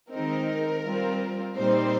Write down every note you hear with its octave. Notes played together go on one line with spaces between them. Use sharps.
D#3 G#3 C4 D#4 A#4
G3 C4 F4
A#2 G3 C4 D#4 C5